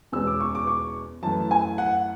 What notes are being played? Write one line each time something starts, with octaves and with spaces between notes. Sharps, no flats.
E2 B2 G#3 C#4 E6
D6
C#6
D6
C#6
F#2 E3 A3 A5
G#5
F#5